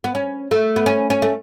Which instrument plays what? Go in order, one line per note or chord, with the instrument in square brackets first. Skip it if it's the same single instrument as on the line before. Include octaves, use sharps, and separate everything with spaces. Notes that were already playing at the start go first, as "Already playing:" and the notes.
[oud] B3
C#4
A3
B3
C#4
C#4
A3